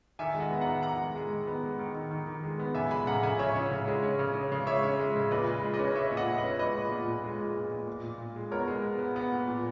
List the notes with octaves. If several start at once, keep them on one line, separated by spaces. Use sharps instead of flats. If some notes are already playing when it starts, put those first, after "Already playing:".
D#3 E5 G#5
G#3
D#5 F#5
B3
F#5 A#5
D#3
D#3 F#5 A#5
G#3
G#3
D#3
B3
G#3
D#3
D#3
D#3
D#3
G#3
B3
C#3 E5 G#5
G#3 G#5 B5
C#3 F#5 A#5
C#3 E5 G#5
C#3 C#5 E5
C#4
C#3
G#3
C#4
C#3
C#4
C#3
G#3 C#5 E5
C#4
G#3
C#3
A#2 B4 D#5
G#3
G#3
B4 D#5
C#4
C#4 C#5 E5
A#2
D#5 F#5
A#2
B4 D#5
C#4
G#3 B4 D#5
A#2
A#2
A#2
G#3
G#3
A#2
A#2
A#2
A#2
A#2
G#3
B3 A#4 C#5
G#3
B3
B3
B3
A#2
A#2